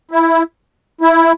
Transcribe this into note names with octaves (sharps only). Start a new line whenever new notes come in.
E4
E4